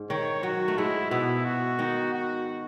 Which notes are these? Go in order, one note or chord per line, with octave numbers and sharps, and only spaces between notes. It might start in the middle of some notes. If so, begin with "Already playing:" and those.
Already playing: G#2
D#3 C#5
F#3 F#4
A3
G#2 G#3 E4
B2 B3 E4
F#4
D#3 D#4
F#4